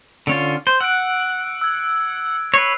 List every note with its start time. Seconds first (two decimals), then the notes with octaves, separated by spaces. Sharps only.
0.27 D3 C#4 F4
0.67 C5
0.81 F#5 E6 F#6 D7
1.61 E6 G#6
2.54 B4 C#5 C7